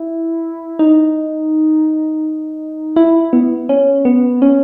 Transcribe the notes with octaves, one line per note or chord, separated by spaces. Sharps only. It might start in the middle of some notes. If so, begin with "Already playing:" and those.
Already playing: E4
D#4
E4
B3
C#4
B3
C#4